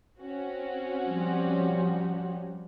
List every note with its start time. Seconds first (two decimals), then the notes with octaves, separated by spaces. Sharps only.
0.19 C4 C#4 F#4
1.06 F3 G3